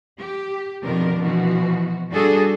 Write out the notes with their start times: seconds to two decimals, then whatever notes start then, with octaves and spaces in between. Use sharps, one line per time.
0.18 G4
0.83 F2 B2 D#3 F3 D4 A#4
1.20 B2 E3 F3 F#4
2.10 G3 D4 F#4 G#4 A4